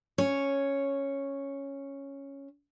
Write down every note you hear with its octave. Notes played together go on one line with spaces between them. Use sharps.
C#4 C#5